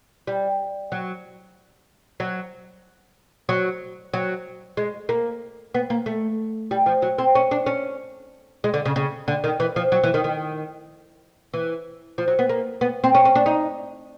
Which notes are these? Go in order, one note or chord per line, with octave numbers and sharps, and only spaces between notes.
G3
F#3
F#3
F#3
F#3
G#3
A#3
B3
A#3
A3
G3
F3
F#3
C4
C#4
D4
C#4
G#3
D3
C#3
C#3
D3
D#3
E3
F3
F#3
E3
D#3
D#3
E3
F3
F#3
B3
A#3
B3
C4
C#4
C#4
D4
D#4